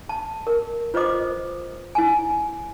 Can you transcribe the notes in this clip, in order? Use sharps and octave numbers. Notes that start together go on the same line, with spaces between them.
A5
A#4
F4 B4 C5 D#5 D6 D#6
E4 G#5